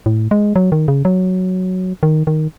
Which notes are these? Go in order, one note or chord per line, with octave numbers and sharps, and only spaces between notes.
A2
G#3
F#3
D#3
C#3
F#3
D#3
D#3